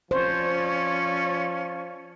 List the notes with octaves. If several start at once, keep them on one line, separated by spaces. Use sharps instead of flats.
F3 C#4 C5 D5